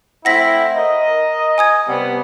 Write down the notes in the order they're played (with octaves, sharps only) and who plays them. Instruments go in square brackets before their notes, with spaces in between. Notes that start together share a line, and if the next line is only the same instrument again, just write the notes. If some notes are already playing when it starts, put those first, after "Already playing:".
[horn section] A3 C4 E4 [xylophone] F#5 A#6 B6
[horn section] A#4 D#5
[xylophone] G#5 D#6 G#6
[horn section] C3 G3 B3